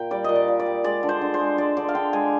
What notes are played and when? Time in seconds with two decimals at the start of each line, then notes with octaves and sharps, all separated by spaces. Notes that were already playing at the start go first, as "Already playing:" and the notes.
Already playing: A#2 G5
0.11 G3 D5
0.24 A#2 D#5
0.36 D5
0.48 A#2
0.60 D5
0.66 G3
0.84 G#3 D5
1.03 D3
1.09 C5
1.21 D3
1.34 C5
1.40 G#3
1.58 G#3 D5
1.77 D3 D5
1.89 F5
1.95 D3 G5
2.13 G#3 G#5